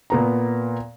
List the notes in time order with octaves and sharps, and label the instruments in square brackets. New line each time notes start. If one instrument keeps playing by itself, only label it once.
[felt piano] A#2 B3 A#5